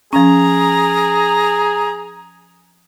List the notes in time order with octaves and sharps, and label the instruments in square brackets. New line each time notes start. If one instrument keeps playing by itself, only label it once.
[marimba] F3 C#4 [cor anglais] G#4 [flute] A#5